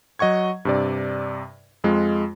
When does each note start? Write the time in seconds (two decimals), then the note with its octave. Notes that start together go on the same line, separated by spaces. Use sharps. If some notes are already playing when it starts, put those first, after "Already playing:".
0.19 F#3 D#5 F#5 C#6 G#6
0.65 G2 C3 D5
1.84 F2 G#3 F4